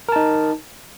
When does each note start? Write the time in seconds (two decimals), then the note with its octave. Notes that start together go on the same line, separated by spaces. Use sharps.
0.09 A#4
0.12 A5
0.16 D#4